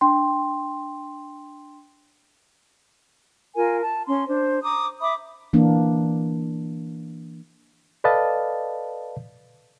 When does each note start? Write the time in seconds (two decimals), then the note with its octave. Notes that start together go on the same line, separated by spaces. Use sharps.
0.01 D4 G5 C6
3.55 F4 A#4 G#5
3.82 A5
4.06 C#4 C6
4.27 D4 C5
4.62 A#5 D6 D#6
5.00 E5 B5 D6 D#6
5.53 E3 A#3 D4
8.04 A4 B4 D5 D#5 F5 A5